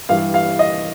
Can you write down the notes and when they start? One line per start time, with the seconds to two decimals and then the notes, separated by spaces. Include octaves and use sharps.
0.09 G2 E3 G3 F5
0.34 F5
0.59 D#5